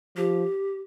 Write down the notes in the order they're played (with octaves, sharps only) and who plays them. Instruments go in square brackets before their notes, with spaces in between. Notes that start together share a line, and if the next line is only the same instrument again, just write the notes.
[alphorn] F3 [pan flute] G4